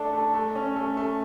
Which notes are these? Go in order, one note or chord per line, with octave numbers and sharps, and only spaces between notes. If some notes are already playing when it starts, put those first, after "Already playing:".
Already playing: A3 D4 A4
A3
A3
C#4
A3
A3